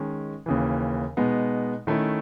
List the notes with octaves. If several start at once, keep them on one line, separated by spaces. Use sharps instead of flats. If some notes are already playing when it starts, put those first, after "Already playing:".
Already playing: D#3 G#3 C#4
D#2 C#3 E3
B2 G#3 B3 D#4
D#3 A3 C#4 E4